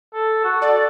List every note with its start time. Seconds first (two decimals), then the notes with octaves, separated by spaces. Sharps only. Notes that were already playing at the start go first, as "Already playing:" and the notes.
0.14 A4
0.44 F#4
0.62 A4 D5